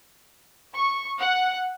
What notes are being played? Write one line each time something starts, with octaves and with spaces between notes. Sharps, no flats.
C#6
F#5